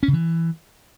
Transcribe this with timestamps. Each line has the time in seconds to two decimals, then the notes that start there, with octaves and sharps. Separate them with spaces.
0.03 C#4
0.08 C#3
0.13 E3